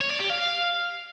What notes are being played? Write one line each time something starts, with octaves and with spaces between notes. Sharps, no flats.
C#5
D5
G4
F5